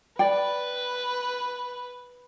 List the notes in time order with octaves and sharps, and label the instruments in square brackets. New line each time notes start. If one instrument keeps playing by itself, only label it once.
[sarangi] B4 [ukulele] D5 G5